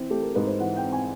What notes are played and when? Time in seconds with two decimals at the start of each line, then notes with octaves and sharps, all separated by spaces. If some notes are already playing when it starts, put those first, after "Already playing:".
Already playing: E3 C4
0.10 A3 G4
0.22 A#4
0.35 G#2 B4
0.47 C5
0.60 E3 F#5
0.76 G5
0.85 C4
0.92 G#5